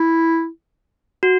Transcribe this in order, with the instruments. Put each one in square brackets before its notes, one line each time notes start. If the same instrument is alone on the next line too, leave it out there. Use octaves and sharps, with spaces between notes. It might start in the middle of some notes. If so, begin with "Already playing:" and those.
Already playing: [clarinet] E4
[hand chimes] F#4